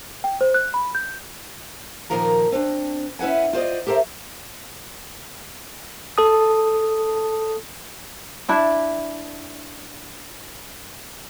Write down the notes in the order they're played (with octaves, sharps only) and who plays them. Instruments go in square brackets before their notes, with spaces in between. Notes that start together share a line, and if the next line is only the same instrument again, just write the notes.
[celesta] G5
C5
F#6
B5
G6
[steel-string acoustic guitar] F2 A#2 D#3 F3 A#4 A#5
C4 D4
C#4 E4 B4 F#5 G#5
F4 C5 D5 D#5
G4 A4 A#4 C5 E5
[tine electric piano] A4 A5 D#6
[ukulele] D4 E4 A5